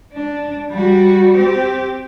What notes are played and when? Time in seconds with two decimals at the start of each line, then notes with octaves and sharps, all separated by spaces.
0.13 D4
0.70 G3 F#4
1.37 C4 G4